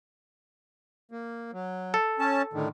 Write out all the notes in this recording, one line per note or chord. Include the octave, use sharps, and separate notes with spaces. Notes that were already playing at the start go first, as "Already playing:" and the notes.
A#3
F#3
A4
C#4 A5
A2 D3 D#3